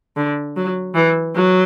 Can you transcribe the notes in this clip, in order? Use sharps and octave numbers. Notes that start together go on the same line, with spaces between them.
D3
F#3
E3
F#3